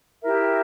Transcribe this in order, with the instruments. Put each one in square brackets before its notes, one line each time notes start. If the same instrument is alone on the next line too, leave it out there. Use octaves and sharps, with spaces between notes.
[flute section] E4 G4 A#4 E5